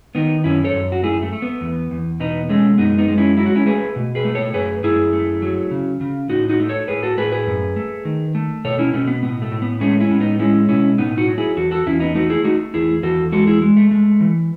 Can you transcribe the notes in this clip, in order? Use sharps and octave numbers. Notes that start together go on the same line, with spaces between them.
D#3 B3 D#4
F#2 C#4 E4
A4 C#5
F#2
F#4
A3 E4 G#4
A3
A3
B3
E2
E2
B2 B3 D#4
G#3 A3 C#4
F#2 B3 D#4
B3 D#4
G#3
C#4 E4
F#3 E4
F#4
C#4 E4
A3 G#4 B4
B2
G#4 B4
A3
A4 C#5
F#2 G#4 B4
F#2 E4 G#4
A3
F#3
C#3
C#3
A2 D#4 F#4
D#4 F#4
A3
A4 C#5
A2 G#4 B4
F#4 A4
A2 G#4 B4
G#4 B4
F#2
A3
D#3
A3
B2 A4 C#5
C#4 E4
B2 A3 C#4
B3
A2 B3
A3
A2
B3
G#3 A3 C#4
C#4 E4
A2
B3 D#4
G#3 C#4 E4
B2 C#4 E4
A2 B3 D#4
D#4 F#4
F#3
E4 G#4
E2 F#4 A4
F#4 A4
E2 C#4 E4
B3 D#4
A3 D#4 F#4
E4 G#4
A3 D#4 F#4
E2 E4 G#4
E2 F#4 A4
G#3 F#4 A4
E4 G#4
G#3
A3
G#3
E3